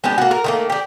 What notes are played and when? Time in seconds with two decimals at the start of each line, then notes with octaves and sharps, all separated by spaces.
0.04 G#3 B3 D4 G4
0.18 A#3 F#4
0.31 A#4
0.44 D#3 A3 A#3
0.70 G4 D5